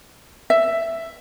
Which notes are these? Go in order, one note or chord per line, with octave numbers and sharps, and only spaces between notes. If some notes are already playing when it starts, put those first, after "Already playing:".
E5